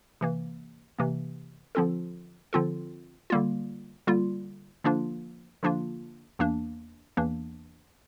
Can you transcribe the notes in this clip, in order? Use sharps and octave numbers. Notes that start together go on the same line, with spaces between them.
C3 E3 A#3
C3 E3 A#3
D3 F3 C4 F4 A4
D3 F3 C4 F4 A4
D3 G3 A#3 F4
D3 G3 A#3 F4
D3 F3 A#3 D4 F4
D3 F3 A#3 D4 F4
E2 E3 A#3 D4
E2 E3 A#3 D4